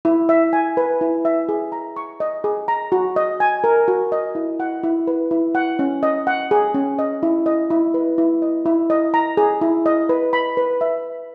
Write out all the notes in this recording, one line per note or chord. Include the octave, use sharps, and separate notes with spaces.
E4
E5
G#5
B4
E4
E5
G#4
A#5
C#6
D#5
G#4
A#5
F#4
D#5
G#5
A#4
F#4
D#5
E4
F#5
E4
B4
E4
F#5
C#4
D#5
F#5
G#4
C#4
D#5
E4
D#5
E4
B4
E4
D#5
E4
D#5
A#5
G#4
E4
D#5
B4
B5
B4
E5